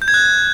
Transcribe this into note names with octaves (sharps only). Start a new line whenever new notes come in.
G6
G#6
F#6